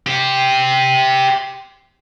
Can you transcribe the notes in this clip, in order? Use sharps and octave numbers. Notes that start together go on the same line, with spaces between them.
G4 C5